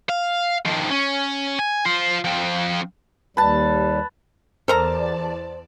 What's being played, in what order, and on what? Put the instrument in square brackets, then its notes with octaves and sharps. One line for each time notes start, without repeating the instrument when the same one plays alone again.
[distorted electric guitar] F5
D#3 F3
C#4
G#5
F4 C5
F3 C4
[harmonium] D#2 G3 [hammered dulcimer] B4 A5
[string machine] E2 D5 A5 [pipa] A4 A#4 A#5 [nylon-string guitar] C5